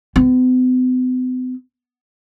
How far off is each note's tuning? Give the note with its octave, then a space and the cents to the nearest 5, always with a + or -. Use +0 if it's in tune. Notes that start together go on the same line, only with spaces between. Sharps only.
B3 +45